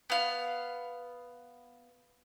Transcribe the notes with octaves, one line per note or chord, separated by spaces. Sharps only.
B3 F5